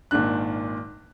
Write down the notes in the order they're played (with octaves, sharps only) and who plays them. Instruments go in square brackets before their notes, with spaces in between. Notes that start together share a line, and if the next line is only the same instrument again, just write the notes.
[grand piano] G#1 A#2 D#3 D4 F#6